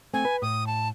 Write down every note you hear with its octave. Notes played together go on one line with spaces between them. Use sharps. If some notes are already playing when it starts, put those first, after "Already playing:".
A3 C4 G#5
B4
A2 D#6
A5